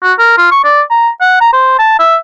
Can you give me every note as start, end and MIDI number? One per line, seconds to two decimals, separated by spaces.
0.03 0.13 66
0.19 0.36 70
0.37 0.48 65
0.51 0.61 85
0.64 0.81 74
0.90 1.09 82
1.21 1.36 78
1.41 1.50 82
1.53 1.78 72
1.79 1.99 81
1.99 2.16 76